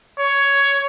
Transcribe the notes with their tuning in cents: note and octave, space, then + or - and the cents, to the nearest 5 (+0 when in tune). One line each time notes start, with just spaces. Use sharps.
C#5 +10